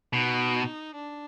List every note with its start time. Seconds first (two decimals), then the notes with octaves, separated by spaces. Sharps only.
0.13 B2 D#4
0.95 D4